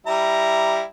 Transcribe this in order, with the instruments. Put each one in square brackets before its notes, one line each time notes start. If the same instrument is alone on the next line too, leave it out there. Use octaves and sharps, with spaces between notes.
[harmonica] G3 E4 A#5